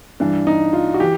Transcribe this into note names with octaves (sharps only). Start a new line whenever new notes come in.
G2 E3 D4
D#4
F4
F#4
E3 G4